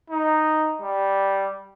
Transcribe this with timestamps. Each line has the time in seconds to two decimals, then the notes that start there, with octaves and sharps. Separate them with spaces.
0.10 D#4
0.82 G3